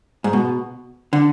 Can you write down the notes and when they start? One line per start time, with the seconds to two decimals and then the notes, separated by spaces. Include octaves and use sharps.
0.24 G#2
0.33 B2
1.13 D3